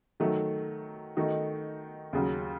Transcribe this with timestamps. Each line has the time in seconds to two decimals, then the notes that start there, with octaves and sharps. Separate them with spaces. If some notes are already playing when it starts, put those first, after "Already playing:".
0.20 D#3 F#3 A3
1.17 D#3 A3 D#4 F#4
2.13 D#2 C#3 F#3